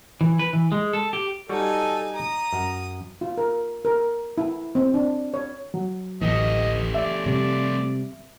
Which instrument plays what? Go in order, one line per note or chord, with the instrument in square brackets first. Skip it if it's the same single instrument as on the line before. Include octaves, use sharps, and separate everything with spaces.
[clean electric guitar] E3
B4
E3
G#3
A4
G4
[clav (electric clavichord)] G3 F#4 C#5 [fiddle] D#4 G#5 [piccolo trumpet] A4
[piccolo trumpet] A#5 [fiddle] D#6
[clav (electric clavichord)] F#2
[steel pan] F4
A#4
A#4
E4
C4
D4
C#5
[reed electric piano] F#3
[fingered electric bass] D1 A1 E3 [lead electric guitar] A3 G4 [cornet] D#5
[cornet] D5 [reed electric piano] E5
[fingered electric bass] C3 G3 [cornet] D5